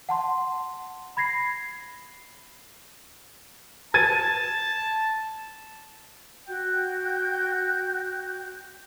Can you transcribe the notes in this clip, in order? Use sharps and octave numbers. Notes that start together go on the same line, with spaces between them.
F#5 A5 C6
B5 G#6 A#6 C7
A5 G#6 A6 D#7
F#4 G5 G6